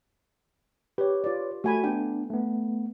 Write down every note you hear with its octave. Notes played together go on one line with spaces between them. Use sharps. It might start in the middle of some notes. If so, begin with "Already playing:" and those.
G4 B4 C#5
F4 D5
A3 F#4 G#5 B5
B3 D4 G5
A3 B3